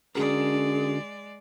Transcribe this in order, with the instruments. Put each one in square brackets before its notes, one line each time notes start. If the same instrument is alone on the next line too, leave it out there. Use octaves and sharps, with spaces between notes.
[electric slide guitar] D3 F#4 A#4 [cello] G#3 D5 [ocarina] C#4 [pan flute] G#4